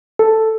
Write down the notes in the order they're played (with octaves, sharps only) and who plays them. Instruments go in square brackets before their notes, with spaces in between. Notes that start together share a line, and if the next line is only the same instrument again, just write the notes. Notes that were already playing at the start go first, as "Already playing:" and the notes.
[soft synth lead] A4